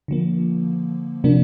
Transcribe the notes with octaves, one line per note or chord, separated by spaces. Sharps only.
D3 F3 A#3
C3 F3 A#3 D4